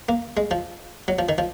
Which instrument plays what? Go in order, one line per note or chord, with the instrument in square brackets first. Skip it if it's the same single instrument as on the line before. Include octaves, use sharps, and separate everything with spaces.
[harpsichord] A#3
G#3
F3
F#3
F3
D#3
F3